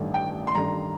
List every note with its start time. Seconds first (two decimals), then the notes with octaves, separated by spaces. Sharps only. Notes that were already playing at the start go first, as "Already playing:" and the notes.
Already playing: A1 G2 D#3 A3 D4
0.14 G5
0.47 C6
0.54 A1 G2 D#3 A3 D4 A#5